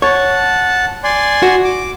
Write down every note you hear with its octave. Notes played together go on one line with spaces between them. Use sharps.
C#5 F#5 A5
D5 G#5 C6
F#4
D6